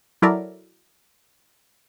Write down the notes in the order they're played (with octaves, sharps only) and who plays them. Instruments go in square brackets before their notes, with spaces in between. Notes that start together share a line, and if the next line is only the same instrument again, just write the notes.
[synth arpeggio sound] F#3 E4 A4 A#4 D5